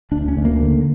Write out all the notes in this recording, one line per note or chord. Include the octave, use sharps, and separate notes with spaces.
D2 D4
C#4
D2
A#3
D3